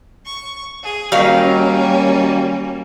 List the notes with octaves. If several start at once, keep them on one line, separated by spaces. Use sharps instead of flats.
C#6
G#4
D#3 F#3 G3 A#3 C#4 F5